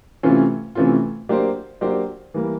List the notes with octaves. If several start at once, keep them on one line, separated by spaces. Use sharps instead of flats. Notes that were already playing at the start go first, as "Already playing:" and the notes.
C3 E3 A3 C#4 F4
C3 E3 A3 C#4 F4
F#3 A#3 D4 G4 C5
F#3 A#3 D4 G4 C5
E3 G3 A#3